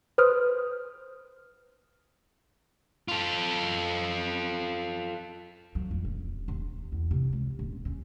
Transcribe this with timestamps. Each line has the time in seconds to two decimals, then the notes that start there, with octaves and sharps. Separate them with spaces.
0.18 B4 C5 D#6 F6
3.08 F4 A4
5.75 F#3
5.91 F2
6.05 D#1
6.48 D#2
6.92 E2
7.11 C3
7.32 C#2
7.59 D#1
7.85 C#4